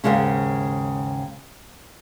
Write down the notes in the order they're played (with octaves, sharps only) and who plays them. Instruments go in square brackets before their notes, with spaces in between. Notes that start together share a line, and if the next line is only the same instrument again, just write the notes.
[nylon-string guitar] D#2 G#2 C#3 G#3 C#4